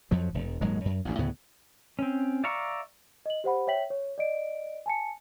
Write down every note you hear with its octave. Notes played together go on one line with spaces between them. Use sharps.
F2 F3 F#3
E1
D#1 G#2 F#3 G#3
F#2
A1 D2 G2
D2 A2 C#3 B3
C4 C#4
D5 E5 F5 A#5 C#6
D#5 F#7
G4 C5 F#5 B5
C#5 E5 G5 B6 F#7
C#5
D5 D#5 D7
G#5 A5 C#7